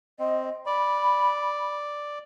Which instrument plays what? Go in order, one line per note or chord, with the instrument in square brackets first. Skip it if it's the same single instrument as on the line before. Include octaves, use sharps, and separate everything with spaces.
[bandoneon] C4 [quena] D#5
[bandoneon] D5 [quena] B5